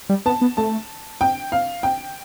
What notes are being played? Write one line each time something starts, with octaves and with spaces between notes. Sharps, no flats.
G3
B3 A5
B3
A3 A5
G5
F5
G5